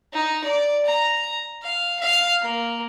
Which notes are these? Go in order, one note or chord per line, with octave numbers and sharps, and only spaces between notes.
D#4
D5
A#5
F5
F5
A#3